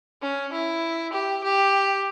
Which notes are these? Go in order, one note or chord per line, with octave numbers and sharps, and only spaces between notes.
C#4
E4
G4
G4